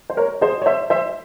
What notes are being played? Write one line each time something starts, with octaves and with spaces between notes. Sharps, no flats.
C5
A#4 C#5
G#4 C5
C#5
C5 E5
C5 E5